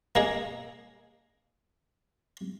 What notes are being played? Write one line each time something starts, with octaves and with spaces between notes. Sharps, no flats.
A#3 G#4 D#5